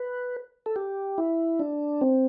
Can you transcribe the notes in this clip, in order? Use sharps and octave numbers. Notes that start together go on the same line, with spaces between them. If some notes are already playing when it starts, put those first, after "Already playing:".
Already playing: B4
A4
G4
E4
D4
C4